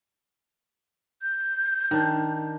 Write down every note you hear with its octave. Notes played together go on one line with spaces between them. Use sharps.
G6
D#3 D4